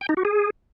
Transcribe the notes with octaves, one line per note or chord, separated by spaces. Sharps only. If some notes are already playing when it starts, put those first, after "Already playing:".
G5
D#4
F#4
G#4